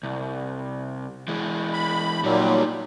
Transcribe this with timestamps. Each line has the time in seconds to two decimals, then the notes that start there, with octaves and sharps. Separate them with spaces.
0.03 C2
1.28 E3 G#3
1.73 B5
2.24 A#2 F#3 G3 D#4 C#5